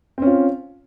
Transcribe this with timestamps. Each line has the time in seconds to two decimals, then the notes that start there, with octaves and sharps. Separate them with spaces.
0.18 C4
0.22 C#4
0.27 F4